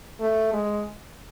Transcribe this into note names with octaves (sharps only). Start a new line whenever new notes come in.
A3
G#3